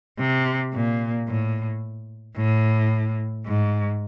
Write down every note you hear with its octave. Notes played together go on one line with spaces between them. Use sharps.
C3
A#2
A2
A2
G#2